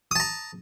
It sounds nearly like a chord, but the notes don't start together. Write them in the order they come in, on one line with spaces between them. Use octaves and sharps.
D#6 A5 A#5